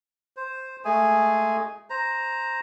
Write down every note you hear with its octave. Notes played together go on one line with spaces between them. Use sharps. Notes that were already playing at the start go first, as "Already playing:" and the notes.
C5
G#3 A3 G#4 G#5
C5 A#5